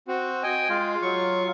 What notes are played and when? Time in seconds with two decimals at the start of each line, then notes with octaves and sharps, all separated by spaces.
0.08 C4 F#4
0.43 D#5 G5 G#5
0.70 G#3 F4
1.02 F#3 C#6